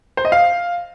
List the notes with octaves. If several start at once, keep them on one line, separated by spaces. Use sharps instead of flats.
C5
D#5
F5